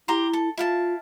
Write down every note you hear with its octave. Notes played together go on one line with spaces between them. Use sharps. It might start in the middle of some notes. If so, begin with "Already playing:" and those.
E4 G4 A#5 C6
A4
E4 F4 F5 A5